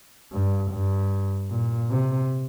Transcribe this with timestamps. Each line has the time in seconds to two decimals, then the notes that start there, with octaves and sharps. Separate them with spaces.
0.32 G2
0.71 G2
1.51 A#2
1.91 C3